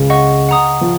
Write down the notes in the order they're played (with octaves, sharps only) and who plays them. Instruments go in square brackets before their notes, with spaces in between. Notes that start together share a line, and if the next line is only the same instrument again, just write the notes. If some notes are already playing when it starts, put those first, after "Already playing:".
Already playing: [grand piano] C#2 C#3
[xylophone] D#5 F#5 C#6
F#5 A#5 D#6
[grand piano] F3